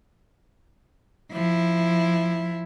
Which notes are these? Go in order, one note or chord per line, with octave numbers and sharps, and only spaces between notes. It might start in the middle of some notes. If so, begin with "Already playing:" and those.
F3 E4